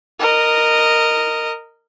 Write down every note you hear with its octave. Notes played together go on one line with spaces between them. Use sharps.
A#4 D#5